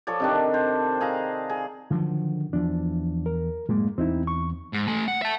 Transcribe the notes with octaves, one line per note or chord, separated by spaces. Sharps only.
F3 A4 C#5 D5
C3 D#3 D4
C5
G#4 F5 A#5
G#4
D3 D#3 F3 F#3
E2 F3 D4
A#4
F#2 A2 G#3 A#3
E2 C4 D#4 E4
C#6
G#2
A3 G#5
F#5
E5 A5